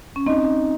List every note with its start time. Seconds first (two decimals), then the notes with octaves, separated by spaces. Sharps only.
0.16 C#4
0.26 C4 D#4